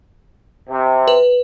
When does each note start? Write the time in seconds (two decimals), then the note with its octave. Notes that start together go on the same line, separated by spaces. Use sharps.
0.69 C3
1.08 B4